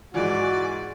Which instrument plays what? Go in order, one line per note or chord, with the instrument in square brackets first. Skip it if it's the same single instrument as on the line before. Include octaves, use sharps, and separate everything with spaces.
[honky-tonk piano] G#2 E3 F3 [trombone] F#4 [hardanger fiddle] D5